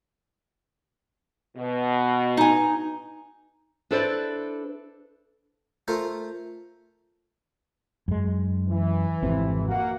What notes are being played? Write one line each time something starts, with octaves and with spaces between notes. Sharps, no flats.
B2
D#4 G#5
D4 E4 A4 B4 C5 D5
A3 F4 A#4 C5 E5
F#2 G#3
E3
G#1 F2 C3
A#3 F#4 F#5